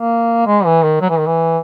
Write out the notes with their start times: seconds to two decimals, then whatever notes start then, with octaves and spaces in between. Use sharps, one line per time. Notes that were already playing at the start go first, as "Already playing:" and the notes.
Already playing: A#3
0.47 G#3
0.65 E3
0.83 D#3
1.01 F#3
1.09 E3
1.19 D#3
1.27 E3